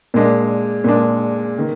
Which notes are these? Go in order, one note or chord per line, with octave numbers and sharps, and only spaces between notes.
A#2 G#3 D4
A#2 G#3 D4
D#3 A#3